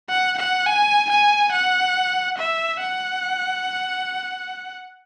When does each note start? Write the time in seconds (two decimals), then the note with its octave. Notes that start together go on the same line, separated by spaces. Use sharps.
0.09 F#5
0.38 F#5
0.66 G#5
1.10 G#5
1.52 F#5
2.38 E5
2.81 F#5